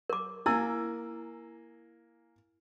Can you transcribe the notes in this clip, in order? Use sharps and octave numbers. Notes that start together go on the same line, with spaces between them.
A#4 D6
A#3 E4 G#5 E6